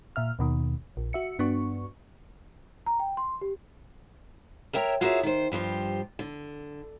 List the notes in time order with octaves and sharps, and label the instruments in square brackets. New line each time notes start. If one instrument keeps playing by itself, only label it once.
[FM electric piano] A#2 E5 F6
D#2 B2 D#3
A#1
F#4 E5 C#7
G2 B3 D4 F#4 C#6
[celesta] A#5
G5
C6
G4
[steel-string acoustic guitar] A#4 C#5 E5 G5 A#5
F4 F#4 G#4 A#4 C#5 E5
D#3 C5
G2 F3 G4 C5
D3